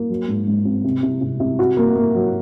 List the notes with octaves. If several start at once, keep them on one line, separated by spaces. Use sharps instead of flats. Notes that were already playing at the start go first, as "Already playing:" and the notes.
Already playing: A#3
F#3
G#2
G#2
C4
C3
C3
C3
C3
F#4
A#3
A#3
F#3